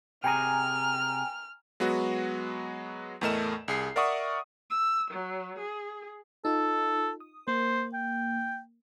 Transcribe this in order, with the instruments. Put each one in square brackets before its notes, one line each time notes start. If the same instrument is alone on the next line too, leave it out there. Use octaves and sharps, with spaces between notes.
[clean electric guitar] C3 G#4 [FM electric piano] G5 G#5 A#5 [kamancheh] F6
[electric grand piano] F#3 G#3 B3 F#4
E2 A2 A3 A#4 D#5 E7
C2 G#4 C7
A#4 D5 E5 F#5 C#6 D#6
[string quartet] E6
F#3
G#4
[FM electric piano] D#4 F4 [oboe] A4
[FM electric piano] D#6
[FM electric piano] A#3 [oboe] C5
[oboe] G5